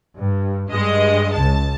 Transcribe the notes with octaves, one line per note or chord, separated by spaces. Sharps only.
G2
G2 G#3 D#5
C#2 A5